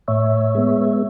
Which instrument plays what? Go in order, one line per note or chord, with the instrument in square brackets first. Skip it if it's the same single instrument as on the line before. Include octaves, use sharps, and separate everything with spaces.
[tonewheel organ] A2 C#5 E5
G#3 B3